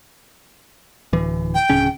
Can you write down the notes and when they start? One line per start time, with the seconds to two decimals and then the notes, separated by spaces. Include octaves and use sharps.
1.13 D1 E3
1.54 G5
1.70 D1 C#3 C#4